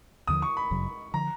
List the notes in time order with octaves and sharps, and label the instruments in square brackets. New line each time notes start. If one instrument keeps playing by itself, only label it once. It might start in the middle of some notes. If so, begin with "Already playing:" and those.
[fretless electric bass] D#2 D3 F3 [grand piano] D#6
[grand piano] C#6
B5
[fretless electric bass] G1 F#2 C#3 F#3
[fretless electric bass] D3 F3 [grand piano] A#5